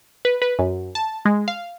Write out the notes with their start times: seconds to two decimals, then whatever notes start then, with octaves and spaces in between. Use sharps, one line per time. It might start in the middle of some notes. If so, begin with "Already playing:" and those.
0.25 B4
0.42 B4
0.59 F#2
0.95 A5
1.25 G#3
1.48 F5